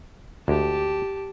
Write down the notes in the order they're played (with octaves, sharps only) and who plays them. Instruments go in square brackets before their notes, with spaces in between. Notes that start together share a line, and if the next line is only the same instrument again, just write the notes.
[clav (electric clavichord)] D2 G#3 [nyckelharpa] G4 A5